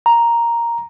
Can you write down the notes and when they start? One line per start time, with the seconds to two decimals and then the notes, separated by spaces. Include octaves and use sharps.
0.06 A#5